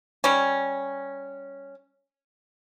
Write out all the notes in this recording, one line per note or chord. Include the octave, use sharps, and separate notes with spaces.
G3 C#4